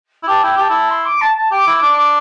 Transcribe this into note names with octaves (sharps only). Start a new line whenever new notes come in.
E4
G4 A5
E4 G5
G4 A5
E4
C6
D6
A5
A5
G4 D6
E4
D4